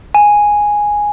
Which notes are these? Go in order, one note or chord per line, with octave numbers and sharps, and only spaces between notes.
G#5